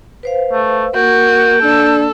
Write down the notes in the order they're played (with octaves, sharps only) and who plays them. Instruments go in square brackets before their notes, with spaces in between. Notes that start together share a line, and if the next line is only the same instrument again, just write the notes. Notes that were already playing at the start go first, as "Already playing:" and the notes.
[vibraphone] B4 C5 F5
[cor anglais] A3
[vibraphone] A#3 [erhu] F#4 [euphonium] A#4 [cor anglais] G5
[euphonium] D4 [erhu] A4